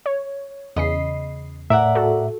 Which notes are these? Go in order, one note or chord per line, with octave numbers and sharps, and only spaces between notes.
C#5
E2 C#3 D#5 B5 C7
A2 A#4 D5 E5 F#5
F#4 A4